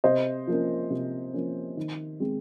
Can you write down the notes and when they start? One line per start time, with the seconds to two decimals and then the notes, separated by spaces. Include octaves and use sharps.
0.04 C3 C5 D#5
0.47 F3 A#3 C#4
0.90 C3
1.33 F3 A#3 C#4
1.77 D#3
2.20 G#3 C4